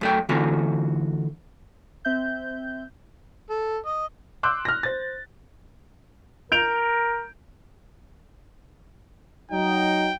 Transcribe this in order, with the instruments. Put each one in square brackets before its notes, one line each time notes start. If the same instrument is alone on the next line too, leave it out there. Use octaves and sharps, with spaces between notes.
[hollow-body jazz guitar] F#2 A3 G5
D3 E3 A3 C4 F4 F#4
[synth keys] C4 E5 G6
[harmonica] A4
D#5
[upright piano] C6 D6 E6 F#6 G6
F6 A#6
C5 A6
[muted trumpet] A#4 [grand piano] G6 D7 F7
[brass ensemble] F#3 D#4 [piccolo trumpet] G5